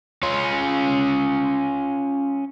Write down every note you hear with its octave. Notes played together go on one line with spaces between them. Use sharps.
C#4 F4